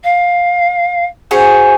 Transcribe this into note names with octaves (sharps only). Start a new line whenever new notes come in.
F5
C#4 F#4 G#4 C5